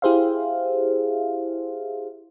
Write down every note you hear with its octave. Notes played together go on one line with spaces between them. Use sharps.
E4 G4 G#4 C5 E5 F5